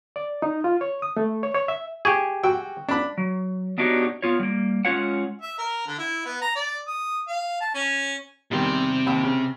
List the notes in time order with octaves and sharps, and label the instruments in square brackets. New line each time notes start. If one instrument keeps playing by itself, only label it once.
[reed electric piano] D5
D#4
F4
C#5
D#6
A3
C#5
C#5
E5
[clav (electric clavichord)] G4 G#4 [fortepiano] C#6
[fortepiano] F#4 G5 E6
D4 B5
[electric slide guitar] F#3
B3 D4 D#4 F#4 G4 C#5
B3 F4 C#5
G3 A#3
G#3 C#4 F4 C#5 F#5
[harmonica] E5
A#4
D3
E4
B3
A#5
D5
D#6
F5
A5
C#4
[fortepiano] E2 D#3 G3 [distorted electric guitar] C3 C6
[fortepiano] D#2 B5 E6
C#3